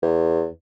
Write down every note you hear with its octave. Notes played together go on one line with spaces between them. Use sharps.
E2